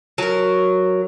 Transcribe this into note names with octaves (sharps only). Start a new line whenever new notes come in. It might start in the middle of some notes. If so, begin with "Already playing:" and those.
F#3 A#4